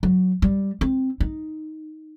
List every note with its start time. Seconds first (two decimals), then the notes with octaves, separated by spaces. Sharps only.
0.03 F#3
0.42 G3
0.81 C4
1.20 D#4